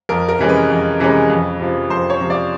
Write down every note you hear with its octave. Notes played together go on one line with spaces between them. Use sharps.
F2 A#4
A#4
C3 E3 G#3 C#4
B4
F2
C3 E3 G#3 C#4
F2
C3 F3
F2 C5
C#5
C3 F3
D5